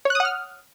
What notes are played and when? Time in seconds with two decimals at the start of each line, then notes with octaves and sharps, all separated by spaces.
0.05 C#5
0.10 F#6
0.15 D#6
0.20 F#5
0.25 F6